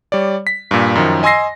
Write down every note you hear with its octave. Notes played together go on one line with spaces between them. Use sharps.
G3 C#5 D5
B6
G2 A#2
F#2 D#3 F3
D#5 G#5 C6 E6 A#6 C7